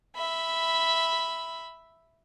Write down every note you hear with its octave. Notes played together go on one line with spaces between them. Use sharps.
E5 B5